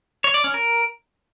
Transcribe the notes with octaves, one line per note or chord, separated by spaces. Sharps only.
C#5
D5
C#4
A#4